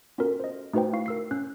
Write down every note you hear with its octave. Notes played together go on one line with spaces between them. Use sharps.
B3 C#4 F4 F#4 A4 A#4
C5 D#5
A3 D#4 F#4 B4 C5 G5
E4 F5 C#6 C7
A#4 E6 C7
C#4 F#6